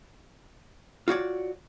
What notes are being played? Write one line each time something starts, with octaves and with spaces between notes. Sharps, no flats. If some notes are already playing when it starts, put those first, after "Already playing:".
F4 F#4 C#5 D5